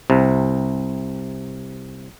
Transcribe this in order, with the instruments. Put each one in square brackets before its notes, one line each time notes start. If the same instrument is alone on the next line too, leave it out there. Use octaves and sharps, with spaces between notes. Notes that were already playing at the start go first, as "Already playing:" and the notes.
[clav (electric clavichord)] C2 C3